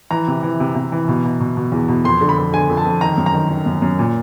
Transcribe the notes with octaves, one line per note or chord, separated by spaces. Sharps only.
E3 A#5
C3
E3
C3
C3
E3
B2
B2
B2
B2
E2
B2
F2 C6
D3
B5
F2
D3 G#5
F2
A5
F2
D#3 A#5
F#2
A#5
D#3
D#3
F#2
F#2
A#2